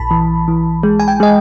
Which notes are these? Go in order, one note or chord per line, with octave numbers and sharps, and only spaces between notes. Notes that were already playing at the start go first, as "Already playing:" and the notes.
Already playing: A#1 A5 B5
E3
E3
G#3
G#5
G5
G#3 D#5